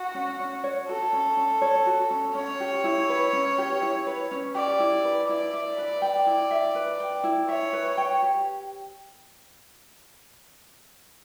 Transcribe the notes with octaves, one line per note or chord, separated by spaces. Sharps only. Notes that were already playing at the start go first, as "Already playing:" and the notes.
Already playing: F#4
C#4
C#4
C#5
F#4 A4
C#4
C#4
C#5
F#4
C#4
C#4 C#5
G4
E4
B4
C#4
G4
E4
B4
C#4
G4 D5
E4
B4
E4 D5
E5
B4
G5
E4
E5
B4
G5
E4
C#5 E5
B4
G5
G4